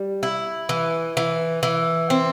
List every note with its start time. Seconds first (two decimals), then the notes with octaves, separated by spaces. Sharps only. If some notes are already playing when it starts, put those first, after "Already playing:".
Already playing: G3
0.23 E4
0.69 E3
1.17 E3
1.63 E3
2.10 C4